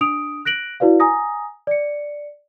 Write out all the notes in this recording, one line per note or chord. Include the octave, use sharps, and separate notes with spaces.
D4 D#6 D7 F7
F#6 A#6 D7 F#7
E4 F#4 B4 D5 F5
G#5 A#5 D#6 A#6
D5 C#7